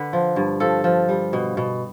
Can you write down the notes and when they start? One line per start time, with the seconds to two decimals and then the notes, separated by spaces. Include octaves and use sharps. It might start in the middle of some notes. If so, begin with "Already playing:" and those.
Already playing: D3 B4
0.13 F3
0.36 G2
0.60 F3 A4
0.84 F3
1.09 G3
1.33 B2
1.57 B2